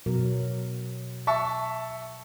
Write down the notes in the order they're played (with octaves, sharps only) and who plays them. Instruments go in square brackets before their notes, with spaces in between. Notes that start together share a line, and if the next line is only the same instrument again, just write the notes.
[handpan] B2 F#3 A#4
[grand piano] E5 A5 C#6